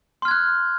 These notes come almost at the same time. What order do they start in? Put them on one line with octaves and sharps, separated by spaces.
C6 F6 G#6 F#6